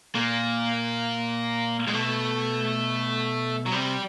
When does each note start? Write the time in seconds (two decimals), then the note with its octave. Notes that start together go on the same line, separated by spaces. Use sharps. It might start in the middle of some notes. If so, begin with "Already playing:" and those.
0.15 A#2 A#3
1.87 A#2 G#3
1.93 B2 A3
3.66 F#3
3.72 C3 G3